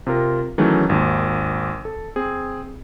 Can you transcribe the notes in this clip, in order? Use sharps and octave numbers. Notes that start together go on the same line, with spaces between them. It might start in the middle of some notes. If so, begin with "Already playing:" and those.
C3 F4 A#4
D#3 E3 F#3 A3 C#4 G#4
G#1 D#2
A4
C4 G#4